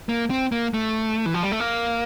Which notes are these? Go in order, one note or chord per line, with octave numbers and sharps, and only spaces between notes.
A#3
C4
A#3
A3
E3
F3
G3
A3
A#3